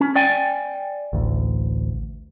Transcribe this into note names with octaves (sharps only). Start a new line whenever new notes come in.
C#4
D5 G5 G#5
A1 D2